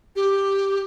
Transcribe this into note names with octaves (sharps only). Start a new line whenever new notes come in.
G4